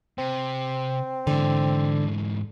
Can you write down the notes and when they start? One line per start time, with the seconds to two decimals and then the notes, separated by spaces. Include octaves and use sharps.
0.18 C3 C4
1.27 G#2 D3 E3